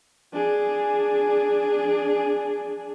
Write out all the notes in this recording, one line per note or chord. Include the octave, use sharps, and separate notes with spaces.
D4 G#4